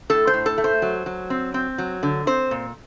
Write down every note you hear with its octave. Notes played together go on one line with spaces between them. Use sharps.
A2 A4
C5
A2
A4
A3
C5
F#3
F#3
C4
C4
F#3
D3
C4 C5
A#2